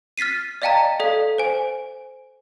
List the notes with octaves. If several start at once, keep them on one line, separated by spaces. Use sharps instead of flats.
F6 A6 B6 C7 D#7
D5 D#5 F5 G5 A5 A#5
A4 D5 F5
C5 G#5